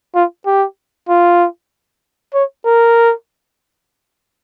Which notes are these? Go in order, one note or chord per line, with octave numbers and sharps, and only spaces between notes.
F4
G4
F4
C#5
A#4